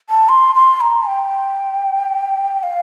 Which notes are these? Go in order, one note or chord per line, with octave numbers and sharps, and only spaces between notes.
A5
C6
C6
A#5
G5
F5